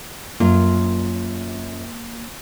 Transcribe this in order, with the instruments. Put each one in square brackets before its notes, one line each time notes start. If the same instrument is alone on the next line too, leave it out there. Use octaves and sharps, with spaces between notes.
[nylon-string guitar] F#2 F4 [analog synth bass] A#3